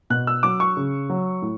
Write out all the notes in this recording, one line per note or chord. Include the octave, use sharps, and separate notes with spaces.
B2 F#6
E6
F#3 D6
C#6
C#3
F#3
A2